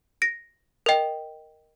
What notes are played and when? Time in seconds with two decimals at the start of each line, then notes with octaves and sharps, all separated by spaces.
0.22 A#6 D7
0.86 A#4 D#5 G5